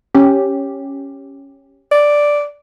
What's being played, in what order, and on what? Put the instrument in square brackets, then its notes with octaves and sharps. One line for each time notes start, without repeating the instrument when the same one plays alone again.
[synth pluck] C#4 G4
[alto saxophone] D5